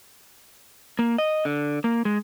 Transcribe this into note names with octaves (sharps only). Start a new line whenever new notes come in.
A#3
D#5
D3
A#3
G#3